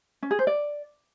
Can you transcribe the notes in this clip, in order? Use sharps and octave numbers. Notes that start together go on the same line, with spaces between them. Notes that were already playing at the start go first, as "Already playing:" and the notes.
C#4
G#4
C5
D5